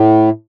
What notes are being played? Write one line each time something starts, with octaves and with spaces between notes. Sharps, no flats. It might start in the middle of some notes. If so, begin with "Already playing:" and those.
Already playing: A2